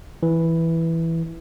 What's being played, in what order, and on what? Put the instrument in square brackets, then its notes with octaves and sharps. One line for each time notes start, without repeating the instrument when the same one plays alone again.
[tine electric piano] E3